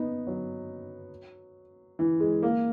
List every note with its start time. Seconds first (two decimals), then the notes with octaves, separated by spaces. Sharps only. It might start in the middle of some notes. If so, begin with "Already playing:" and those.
Already playing: B3 D#4
0.27 F#3
1.99 E3
2.20 G#3
2.43 A#3